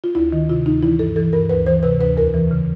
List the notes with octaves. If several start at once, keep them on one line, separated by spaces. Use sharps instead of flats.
F4
D2 E4
D#3
C3 F4
D2 D#4
E3 E4
G2 A4
E3 A4
G2 A#4
D2 B4
E3 C5
C3 B4
D2 B4
E2 A#4
E3
C#3